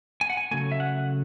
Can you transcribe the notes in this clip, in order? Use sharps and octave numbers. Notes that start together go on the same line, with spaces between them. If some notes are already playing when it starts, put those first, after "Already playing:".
G#5
F#5
G#5
C#3 F#3 A3 G#5
E5
F#5